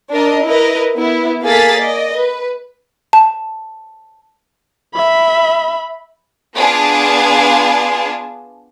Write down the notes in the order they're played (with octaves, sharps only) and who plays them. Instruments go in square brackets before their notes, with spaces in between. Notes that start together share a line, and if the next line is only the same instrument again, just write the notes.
[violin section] D4 A#4 D#5
E4 A#4 B4 D#5
B3 E4
A#3 G#4 A4 F5 A6 B6
D5 D#5
B4
[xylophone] A5
[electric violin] E5 B5
[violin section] B3 D4 F4 G#4 A5